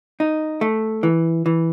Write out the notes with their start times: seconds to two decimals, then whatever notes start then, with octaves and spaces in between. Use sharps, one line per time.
0.20 D#4
0.61 A3
1.03 E3
1.46 E3